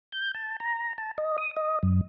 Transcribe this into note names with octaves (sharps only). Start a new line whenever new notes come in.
G6
A5
A#5
A5
D#5
D#6
D#5
F#2